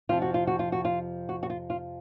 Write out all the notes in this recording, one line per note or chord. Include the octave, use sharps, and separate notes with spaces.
F2 C3 F3 F4
F#4
F4
F#4
F4
F#4
F4
F#4
F#4
F4
F4